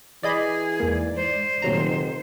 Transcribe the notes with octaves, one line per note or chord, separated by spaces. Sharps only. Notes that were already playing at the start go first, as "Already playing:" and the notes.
E3 G#4 D5 D#5 B5
E2 G#2 A#3 D5
C5
F1 A#2 D#3 F#3 A#5